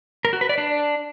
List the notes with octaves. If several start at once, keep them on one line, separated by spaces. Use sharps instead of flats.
A#4
F#4
B4
D5
D4